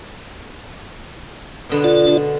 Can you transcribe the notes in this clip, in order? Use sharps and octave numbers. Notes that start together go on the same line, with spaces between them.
B2 D3 B3
F4 D5
D3